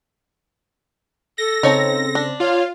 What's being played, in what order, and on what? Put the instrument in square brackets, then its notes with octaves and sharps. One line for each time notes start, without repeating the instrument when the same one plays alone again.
[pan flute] A4 [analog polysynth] A#6
[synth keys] C#3 C4 [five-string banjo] D#4 C#5 A5
[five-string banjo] D4
[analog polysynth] F4 F5 [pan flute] C#5